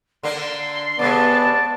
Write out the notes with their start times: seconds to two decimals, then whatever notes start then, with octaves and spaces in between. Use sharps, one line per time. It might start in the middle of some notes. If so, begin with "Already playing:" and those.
0.23 D3 A#3 D4 C6
0.99 C3 G#3 A3 B3 D5 A5